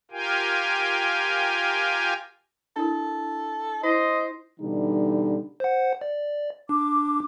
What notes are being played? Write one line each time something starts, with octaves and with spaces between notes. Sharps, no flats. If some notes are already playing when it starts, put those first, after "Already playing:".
F4 G4 A#4 F5 G5 G#5
D4 E4 A4 A#4
E4 C5 D#5
B2 D3 E3 G3 D#4
C5 F#5
D5
D4 D6